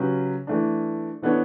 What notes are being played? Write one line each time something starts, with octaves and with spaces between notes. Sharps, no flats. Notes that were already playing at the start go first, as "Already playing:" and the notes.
Already playing: C#3 F#3 C#4 G4 B4
E3 A3 D4
E3 B3 D4 A4 C#5